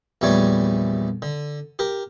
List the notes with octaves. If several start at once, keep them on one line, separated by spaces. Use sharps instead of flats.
A#1 E2 G3 A3 C#5 D5
D3
G4 A#4